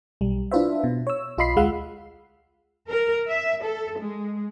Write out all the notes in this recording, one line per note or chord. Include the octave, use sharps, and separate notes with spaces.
B1 G3
D4 E4 F4 B4 C5 E5
B2
C#5 E6
B1 F4 D#5 B5 C7
D2 G#3 F4 F5 F#5 E6
A#4
E5
A4
G#3